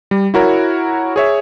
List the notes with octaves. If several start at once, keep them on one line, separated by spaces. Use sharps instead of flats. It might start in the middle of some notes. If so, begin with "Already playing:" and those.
G3
E4 F#4 A#4 C#5
G#4 C#5 E5